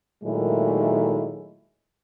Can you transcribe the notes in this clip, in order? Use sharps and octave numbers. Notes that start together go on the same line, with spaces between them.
A#2 D#3 F#3 G#3 A3 E4